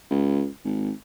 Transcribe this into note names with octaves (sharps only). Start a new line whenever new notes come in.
C#2
G#1